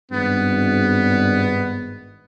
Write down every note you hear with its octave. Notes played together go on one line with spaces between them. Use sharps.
G#1 G2 B3